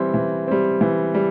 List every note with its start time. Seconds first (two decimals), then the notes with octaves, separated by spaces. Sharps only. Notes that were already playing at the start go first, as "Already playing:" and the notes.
Already playing: E3 G3 C4
0.14 E3
0.48 G3 C4
0.81 E3
1.14 G3